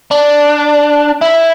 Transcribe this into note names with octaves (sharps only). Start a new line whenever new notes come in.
D4
E4